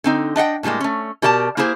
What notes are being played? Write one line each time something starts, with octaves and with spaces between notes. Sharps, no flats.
D3 C4 D#4
D4 D#5 F#5 G5
A2 C#3 G3 G#3 A#3
A3 C#4
B2 G4 A#4 D5 F#5 A5
A#3 E4 G4 G#4 C5